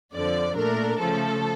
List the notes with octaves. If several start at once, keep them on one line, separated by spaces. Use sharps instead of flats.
F2 D3 F3 D5
A#2 A3 D4 A#4
C#3 F3 A3 A4